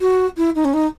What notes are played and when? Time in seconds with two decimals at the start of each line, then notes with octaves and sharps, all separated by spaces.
0.01 F#4
0.37 E4
0.55 D#4
0.64 C#4
0.73 D#4